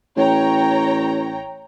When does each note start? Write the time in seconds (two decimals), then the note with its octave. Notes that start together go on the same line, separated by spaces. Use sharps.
0.16 A1 C#5 G5 A#5